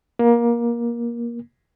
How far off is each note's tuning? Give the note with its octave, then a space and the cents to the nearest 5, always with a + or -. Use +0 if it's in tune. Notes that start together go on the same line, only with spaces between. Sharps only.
A#3 +20